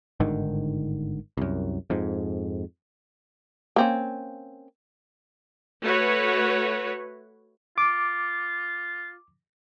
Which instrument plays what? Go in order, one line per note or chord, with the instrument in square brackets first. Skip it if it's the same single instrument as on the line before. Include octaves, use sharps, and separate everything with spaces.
[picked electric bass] G1 G#2 D3 D#3
C2 F#2
F2 G#2
[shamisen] A#3 C4 C#4
[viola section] A3 F#4 B4 C#5
[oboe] F4 [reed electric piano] D6